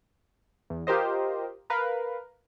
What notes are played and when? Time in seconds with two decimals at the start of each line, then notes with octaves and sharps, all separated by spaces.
0.70 E2
0.87 F4 G4 A#4 C5 D#5
1.70 A#4 B4 F5